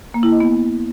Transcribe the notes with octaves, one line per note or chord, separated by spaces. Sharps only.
A#3
E4
D#5
B3